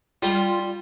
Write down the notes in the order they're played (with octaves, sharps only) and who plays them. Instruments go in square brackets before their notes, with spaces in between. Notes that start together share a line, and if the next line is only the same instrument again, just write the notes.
[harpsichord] G3 [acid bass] F4